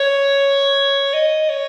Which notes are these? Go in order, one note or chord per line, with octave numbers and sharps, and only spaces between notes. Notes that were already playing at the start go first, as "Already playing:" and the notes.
Already playing: C#5
D#5
C#5